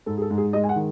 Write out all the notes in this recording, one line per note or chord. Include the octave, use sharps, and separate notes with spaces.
G#2 A4
G#4
A4
G#2
G#4
G#3 D#5
G#5
F#5
D#3